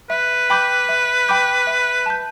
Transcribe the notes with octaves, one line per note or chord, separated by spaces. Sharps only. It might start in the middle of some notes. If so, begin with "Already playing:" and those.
B4 E5
G5 B5 D6 G6
E5
G5 B5 D6 G6
E5
A5 G6